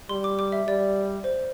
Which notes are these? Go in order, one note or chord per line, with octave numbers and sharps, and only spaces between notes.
G3 C6
D6
D6
E5
G3 D5
C5